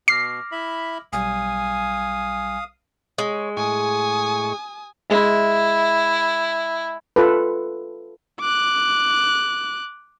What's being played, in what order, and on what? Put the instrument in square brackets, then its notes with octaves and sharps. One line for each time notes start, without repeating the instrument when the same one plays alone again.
[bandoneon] B2 [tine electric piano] D6 F6 A#6 [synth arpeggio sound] C7
[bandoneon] E4 E5 B5
[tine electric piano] B1 G3 [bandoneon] F5 D#6 [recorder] G#5
[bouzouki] G#3 [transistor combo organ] C#5
[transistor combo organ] A2 C#6 [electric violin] G#5 D#6
[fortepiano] G#3 E5 [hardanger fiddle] E4
[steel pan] F4 A4 B4
[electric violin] D6 F#6